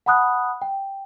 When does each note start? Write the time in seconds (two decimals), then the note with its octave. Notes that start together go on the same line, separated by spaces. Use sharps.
0.06 F#5 A5 B5 D#6 F#6
0.62 G5